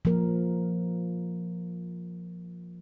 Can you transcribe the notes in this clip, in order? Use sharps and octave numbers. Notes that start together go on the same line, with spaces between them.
F3 A#3 A#4